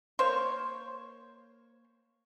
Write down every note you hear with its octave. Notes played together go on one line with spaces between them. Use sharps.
A#3 C5 C#5